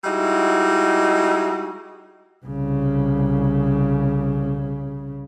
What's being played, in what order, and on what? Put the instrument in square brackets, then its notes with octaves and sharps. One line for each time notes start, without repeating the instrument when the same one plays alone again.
[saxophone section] G3 G#3 D#4 E4 F#4
[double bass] C2 C#3